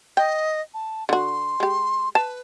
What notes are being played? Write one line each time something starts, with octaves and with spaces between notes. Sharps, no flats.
D#5 G5
A5
D3 F#4 C6
G#3 G4
B4 A5